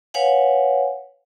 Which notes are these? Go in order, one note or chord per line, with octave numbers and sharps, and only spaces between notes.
B4 C#5 F5 F#5 G#5